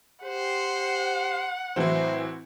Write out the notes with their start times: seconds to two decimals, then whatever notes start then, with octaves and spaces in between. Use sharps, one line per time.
0.23 G4 C5 F#5
1.76 A2 E3 F#3 C4 E4 C5